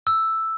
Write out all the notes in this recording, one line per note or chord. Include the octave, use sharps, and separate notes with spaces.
E6